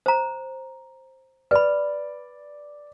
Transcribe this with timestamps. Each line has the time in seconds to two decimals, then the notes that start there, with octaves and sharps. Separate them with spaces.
0.06 C5 A#5
1.51 B4 D5 B5